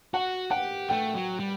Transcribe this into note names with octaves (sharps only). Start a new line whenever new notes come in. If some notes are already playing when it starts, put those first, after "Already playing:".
F#4 F#5
G4 F#5
A3 G5
F#3
G3